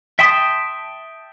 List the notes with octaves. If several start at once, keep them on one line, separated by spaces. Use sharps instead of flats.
E5 G5 A5 C6 D#6